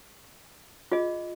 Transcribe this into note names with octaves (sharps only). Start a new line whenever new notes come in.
F4 G#4 D#5